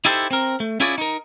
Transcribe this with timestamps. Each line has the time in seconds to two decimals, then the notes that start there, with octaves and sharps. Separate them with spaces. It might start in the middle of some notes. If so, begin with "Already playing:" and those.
0.05 D#4 E4 G4 A4 C5
0.31 C4 A#4
0.60 A3
0.80 C#4 E4 F4 G#4 C#5 D5
0.98 D#4 A#4